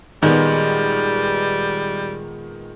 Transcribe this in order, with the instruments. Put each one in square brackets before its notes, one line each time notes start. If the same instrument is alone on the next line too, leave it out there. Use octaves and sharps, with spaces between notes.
[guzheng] A#2 G#3 [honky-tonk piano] D#3 B3 [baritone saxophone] G3